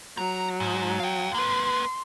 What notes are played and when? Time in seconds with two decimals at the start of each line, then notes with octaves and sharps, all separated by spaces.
0.18 F#3 A#5
0.60 G#2
1.00 F5 G5
1.34 A#3 B4 C6